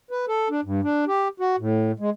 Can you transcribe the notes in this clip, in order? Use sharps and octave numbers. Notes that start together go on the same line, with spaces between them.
B4
A4
D4
G2
D4
G4
F#4
A2
G#3